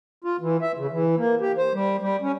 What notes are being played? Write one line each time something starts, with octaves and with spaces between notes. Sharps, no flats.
F4
E3
E5
C#3
E3
A#3
G4
C5
G3
G3
C#4